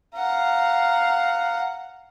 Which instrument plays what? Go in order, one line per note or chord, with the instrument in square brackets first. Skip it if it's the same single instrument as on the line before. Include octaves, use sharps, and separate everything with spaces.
[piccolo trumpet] F5 [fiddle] F#5 A#5